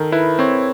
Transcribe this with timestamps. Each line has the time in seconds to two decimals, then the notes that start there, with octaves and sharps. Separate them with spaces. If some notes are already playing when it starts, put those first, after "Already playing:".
Already playing: D#3 A4 A#4
0.12 E4 B4
0.39 C4 C#5